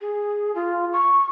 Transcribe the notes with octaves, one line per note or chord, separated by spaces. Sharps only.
G#4
F4
C#6